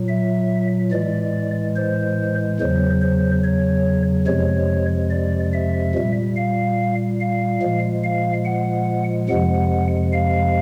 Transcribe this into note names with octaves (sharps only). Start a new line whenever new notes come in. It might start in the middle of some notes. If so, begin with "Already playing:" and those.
Already playing: A#2 F#3
E5
A2 E3 G#3 D5
C5
E2 C#3 F#3 C5
C5
C#5
F2 C3 F3 G#3 C#5
D5
E5
A#2 G3
F5
F5
A#2 F3 G#3
F5
F#5
F2 C3 F3 G#3 F#5
F5